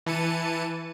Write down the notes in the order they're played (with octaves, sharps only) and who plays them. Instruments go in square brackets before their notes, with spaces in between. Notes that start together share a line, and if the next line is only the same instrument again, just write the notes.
[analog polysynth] E3 A5 C#7 D#7